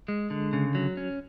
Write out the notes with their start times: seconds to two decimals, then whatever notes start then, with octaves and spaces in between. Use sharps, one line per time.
0.08 G#3
0.30 D3
0.53 C#3
0.75 F#3
0.97 C#4